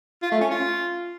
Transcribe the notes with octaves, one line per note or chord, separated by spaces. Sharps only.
F4
A3
C#4
F4